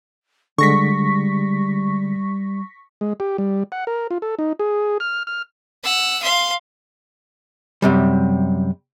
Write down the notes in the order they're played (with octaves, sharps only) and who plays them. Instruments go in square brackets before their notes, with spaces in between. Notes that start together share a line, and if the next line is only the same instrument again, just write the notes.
[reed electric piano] D3 G#3 [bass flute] G3 [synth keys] C#6 A#6 B6
[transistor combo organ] G#3
G4
G3
F#5
A#4
F4
A4
D#4
G#4
F6
F6
[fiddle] F#5 E6
F5 C6
[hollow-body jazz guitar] F#2 C3 G3